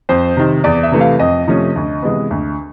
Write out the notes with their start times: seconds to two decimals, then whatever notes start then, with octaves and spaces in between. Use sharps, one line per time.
0.09 F2 C5
0.37 C3 D#3
0.64 E2 D5
0.83 E5
0.91 C3 E3 A3
1.01 F5
1.19 F2 D#5
1.47 C3 F3 A3 C#4
1.76 D2
2.03 C3 E3 G#3 B3
2.31 D2